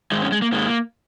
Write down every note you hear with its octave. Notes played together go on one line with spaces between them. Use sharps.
G#2 D#3 G#3 D#4
C#4
G#3
A#3
G#2 D#3 G#3 A#3